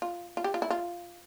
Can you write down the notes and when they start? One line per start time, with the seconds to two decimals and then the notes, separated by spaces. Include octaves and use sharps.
0.02 F4
0.37 F4
0.44 G4
0.54 F4
0.62 E4
0.70 F4